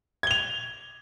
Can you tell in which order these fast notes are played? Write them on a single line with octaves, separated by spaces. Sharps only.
G#6 G7 F7